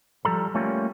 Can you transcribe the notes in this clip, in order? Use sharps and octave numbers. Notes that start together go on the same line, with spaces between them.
F3 G3 A4 A#5
G3 A3 A#3 C#4 F4 G4